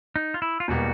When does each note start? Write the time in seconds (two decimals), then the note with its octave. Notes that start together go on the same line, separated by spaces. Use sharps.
0.16 D#4
0.34 F4
0.42 E4
0.60 F4
0.68 E1 B2 G3 A#3 F#4